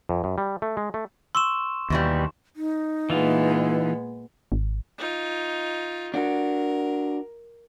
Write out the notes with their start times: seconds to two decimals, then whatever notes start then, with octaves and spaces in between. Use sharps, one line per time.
0.09 F2
0.24 F#2
0.38 G3
0.62 A3
0.77 G#3
0.94 A3
1.35 C6 C#6 E6 E7
1.90 D#2 B2 E3 G3
2.56 D#4
3.10 A#2 E3 G#3 B3 F4
4.52 G#1
4.98 D#4 F4
6.14 D4 F#4 A#4